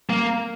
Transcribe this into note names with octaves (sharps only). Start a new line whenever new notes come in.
A#3